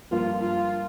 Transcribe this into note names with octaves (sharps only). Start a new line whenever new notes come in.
G2 F3 A#3 F4
F4